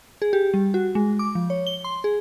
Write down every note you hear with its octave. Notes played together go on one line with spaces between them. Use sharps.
G#4
G4
G3
F#4
G#3
D6
F3
C#5
G7
C6
G#4